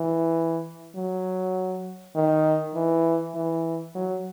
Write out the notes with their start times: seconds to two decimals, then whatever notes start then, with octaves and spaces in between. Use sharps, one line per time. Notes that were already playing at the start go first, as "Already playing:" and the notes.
Already playing: E3
0.95 F#3
2.15 D#3
2.75 E3
3.35 E3
3.95 F#3